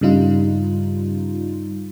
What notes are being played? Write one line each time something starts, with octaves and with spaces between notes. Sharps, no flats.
G2 C#3 G3 D#4 F4